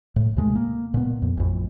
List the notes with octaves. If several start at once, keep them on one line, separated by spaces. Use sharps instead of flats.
A2
D#2 C3 G#3 A3
A#3
A#2 B3
F2
A1 F2